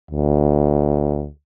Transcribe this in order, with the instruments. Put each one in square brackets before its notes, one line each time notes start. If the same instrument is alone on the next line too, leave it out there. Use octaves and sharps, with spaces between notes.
[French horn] D2